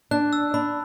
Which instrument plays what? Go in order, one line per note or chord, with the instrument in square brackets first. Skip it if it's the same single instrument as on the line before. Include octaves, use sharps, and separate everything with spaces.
[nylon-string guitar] D4 [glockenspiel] F#6
[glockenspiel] E6
[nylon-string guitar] D4 [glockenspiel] B5